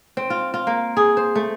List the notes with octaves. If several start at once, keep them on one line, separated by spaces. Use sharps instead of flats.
C4
F4
F4
A#3
G#4
C5
A3